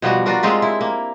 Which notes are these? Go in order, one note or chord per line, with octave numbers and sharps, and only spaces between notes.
B2 F3 G3 F#4
D4 F4 F#4 A#4
G#3 C4 F4 G4
E4
A#3